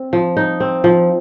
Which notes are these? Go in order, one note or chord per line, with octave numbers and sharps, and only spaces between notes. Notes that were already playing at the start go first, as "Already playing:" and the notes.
Already playing: C4
F3
D#4
C4
F3